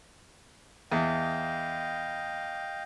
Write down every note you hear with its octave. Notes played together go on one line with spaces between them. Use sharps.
E2 D#5 F5 G5